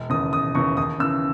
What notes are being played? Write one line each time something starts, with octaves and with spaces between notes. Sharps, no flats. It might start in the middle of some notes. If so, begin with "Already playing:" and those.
Already playing: E1
D#2 C#3 E3 D#6
E1 D#6
D#2 C#3 E3 C#6
D#2 D#6
C#3 E3 E6